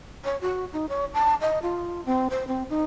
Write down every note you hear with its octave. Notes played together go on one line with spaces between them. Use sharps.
C#5
F#4
D#4
C#5
A5
D#5
F4
C4
C5
C4
D#4